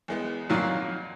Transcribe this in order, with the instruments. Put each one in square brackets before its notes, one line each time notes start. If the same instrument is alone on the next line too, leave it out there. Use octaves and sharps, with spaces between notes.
[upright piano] E2 G#3 B3
[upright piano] F2 F5 [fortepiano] A#2 D#3 F#3